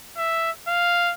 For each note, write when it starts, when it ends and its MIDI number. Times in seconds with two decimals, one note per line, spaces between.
0.17 0.51 76
0.68 1.14 77